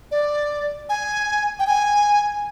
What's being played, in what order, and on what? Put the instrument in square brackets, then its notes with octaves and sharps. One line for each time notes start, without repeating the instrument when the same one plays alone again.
[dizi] D5
G#5
G5
G#5